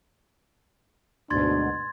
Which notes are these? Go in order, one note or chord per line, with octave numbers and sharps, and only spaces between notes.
D2 G#2 B2 D4 C6 G#6 A6